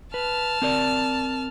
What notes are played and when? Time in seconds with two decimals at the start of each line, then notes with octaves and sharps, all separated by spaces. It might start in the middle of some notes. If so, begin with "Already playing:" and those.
0.14 B4 A5 F6
0.62 C4 A#4 D5